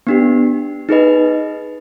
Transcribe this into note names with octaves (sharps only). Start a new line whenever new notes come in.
B3 D4 G4
D#4 G#4 B4 D#5